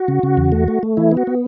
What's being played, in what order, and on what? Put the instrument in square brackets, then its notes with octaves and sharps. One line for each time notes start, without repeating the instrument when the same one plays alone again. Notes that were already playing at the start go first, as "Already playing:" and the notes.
Already playing: [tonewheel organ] F#4
C#3
C#3
E2
A3
A3
A3
E3 E4
B3
F#4
B3